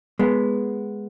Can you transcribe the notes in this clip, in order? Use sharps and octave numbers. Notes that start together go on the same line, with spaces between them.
G#3 B3